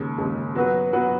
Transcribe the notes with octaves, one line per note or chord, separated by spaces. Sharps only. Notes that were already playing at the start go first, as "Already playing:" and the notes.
Already playing: D#2 C#3 G#3
D#2 C#3 G#3
F#3 B3 F#4 B4
F#3 B3 F#4 B4